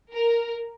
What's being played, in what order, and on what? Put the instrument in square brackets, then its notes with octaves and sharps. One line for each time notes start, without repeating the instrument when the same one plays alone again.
[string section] A#4